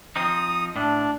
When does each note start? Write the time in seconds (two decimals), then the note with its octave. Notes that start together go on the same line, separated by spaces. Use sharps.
0.16 F3 C4 D#4 D#6
0.76 A2 D4